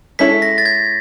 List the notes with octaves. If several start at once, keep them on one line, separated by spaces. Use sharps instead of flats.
G#3 C#4 E4 A4 B6
A#6
A6
G#6